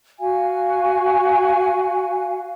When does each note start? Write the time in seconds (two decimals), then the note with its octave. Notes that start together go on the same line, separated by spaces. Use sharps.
0.19 F#4 F5 G#5